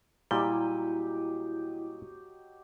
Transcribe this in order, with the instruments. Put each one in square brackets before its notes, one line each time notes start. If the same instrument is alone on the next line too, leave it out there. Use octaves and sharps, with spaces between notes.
[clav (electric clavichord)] A#2 G3 [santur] F#3 G4 D#5 [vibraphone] E4